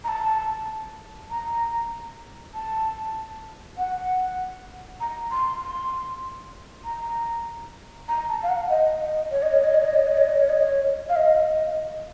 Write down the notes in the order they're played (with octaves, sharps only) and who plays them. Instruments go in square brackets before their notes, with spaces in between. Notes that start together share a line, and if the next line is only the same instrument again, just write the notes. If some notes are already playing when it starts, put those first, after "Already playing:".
[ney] A#5
A5
A#5
A5
F#5
A#5
C6
C6
A#5
A#5
A5
F5
F#5
D#5
D#5
C#5
D#5
C#5
D#5
C#5
D#5
C#5
D#5
C#5
D#5
C#5
D#5
C#5
F5
D#5